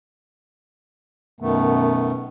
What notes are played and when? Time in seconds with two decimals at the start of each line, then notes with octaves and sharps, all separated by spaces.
1.40 F#2 B2 D#3 A3 B3